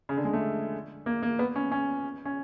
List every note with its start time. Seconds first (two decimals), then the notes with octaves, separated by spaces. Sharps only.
0.09 C#3
0.17 D3
0.25 G#3
0.33 A3
1.06 A#3
1.23 A#3
1.39 B3
1.56 C#4
1.72 C#4
2.25 C#4